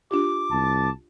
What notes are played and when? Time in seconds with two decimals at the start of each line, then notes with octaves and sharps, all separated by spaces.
0.11 D4 F4 G4 D6
0.51 C2 A5